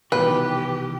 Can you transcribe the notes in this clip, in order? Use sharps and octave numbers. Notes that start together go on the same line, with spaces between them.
C2 G#2 B2 D#3 E3 G4 B4